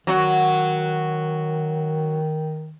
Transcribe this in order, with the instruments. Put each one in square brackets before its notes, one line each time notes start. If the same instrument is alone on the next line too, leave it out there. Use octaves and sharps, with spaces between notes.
[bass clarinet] D#3 [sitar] F#3 F#4